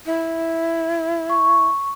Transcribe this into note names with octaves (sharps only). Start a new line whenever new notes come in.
E4
C#6